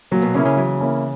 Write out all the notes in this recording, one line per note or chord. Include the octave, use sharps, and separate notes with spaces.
A#2 F#3
B2
C#3 A#3 C#4 E4
C#3
E3 F#3
A#3 C#4 E4